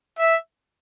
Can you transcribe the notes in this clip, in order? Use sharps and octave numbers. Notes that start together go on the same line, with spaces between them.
E5